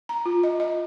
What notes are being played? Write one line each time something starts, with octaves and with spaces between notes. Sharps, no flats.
A#5
F4
D#5
D#5